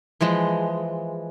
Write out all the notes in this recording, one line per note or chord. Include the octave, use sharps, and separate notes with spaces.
E3 F3 G#3